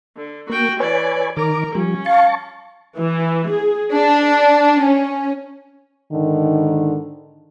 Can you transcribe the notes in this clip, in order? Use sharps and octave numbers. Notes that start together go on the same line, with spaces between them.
D3
A#3 F#4 G5
E3 B4 C#5 D5 G#5
D#3 A#4 D6
F3 G3 C#4
F5 A5 C#6
E3
G#4
D4
C#4
G#2 D3 D#3